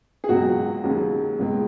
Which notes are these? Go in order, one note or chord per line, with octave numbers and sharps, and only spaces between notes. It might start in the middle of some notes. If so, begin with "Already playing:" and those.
G#4
C#2 B2 F#3 F#4
D#2 C#3 F#3
C#2 B2 G#3